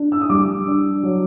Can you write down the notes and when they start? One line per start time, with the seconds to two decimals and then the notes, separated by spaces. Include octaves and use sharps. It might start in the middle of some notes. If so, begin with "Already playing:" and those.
Already playing: D4
0.12 E6
0.21 D#6
0.29 G3 D6
0.66 D4
1.03 F#3